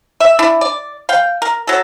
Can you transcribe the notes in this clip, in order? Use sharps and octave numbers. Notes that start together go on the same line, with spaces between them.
E5
D4 E4
D5
F5 G5
A#4
F#3 A4